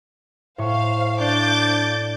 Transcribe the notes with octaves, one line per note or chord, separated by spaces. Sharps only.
A2 C5 F5 C#6
D4 D6 G6 A6